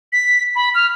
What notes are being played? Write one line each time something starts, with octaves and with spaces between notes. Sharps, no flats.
B6
B5
F6